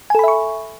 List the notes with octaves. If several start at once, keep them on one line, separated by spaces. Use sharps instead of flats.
A4 E5 G#5 B5 C#6